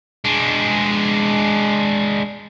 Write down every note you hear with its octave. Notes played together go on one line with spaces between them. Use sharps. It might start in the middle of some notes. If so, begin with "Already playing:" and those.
G#3 D4